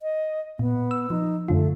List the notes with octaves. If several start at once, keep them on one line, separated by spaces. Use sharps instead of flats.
D#5
A#2 B3
E6
F3 D#4
F#2 D3 A3 F4